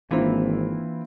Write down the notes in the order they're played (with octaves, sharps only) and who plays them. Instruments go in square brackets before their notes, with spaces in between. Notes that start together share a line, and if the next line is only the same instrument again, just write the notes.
[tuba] G#1 [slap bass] E3 [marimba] A#3 D4 [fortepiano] C4 E4 F4